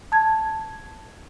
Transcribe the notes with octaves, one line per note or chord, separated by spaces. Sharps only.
A5 G#6